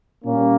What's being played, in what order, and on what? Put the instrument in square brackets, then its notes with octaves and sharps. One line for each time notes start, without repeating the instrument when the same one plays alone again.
[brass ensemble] A#2 G3 A#3 C#4